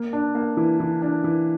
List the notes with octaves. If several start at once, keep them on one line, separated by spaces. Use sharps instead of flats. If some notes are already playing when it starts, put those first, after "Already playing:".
Already playing: A#3
D4
A#3
E3
E3
D4
E3